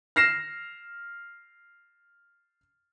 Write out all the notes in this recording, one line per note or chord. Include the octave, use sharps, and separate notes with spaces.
F6 A#6 C7 E7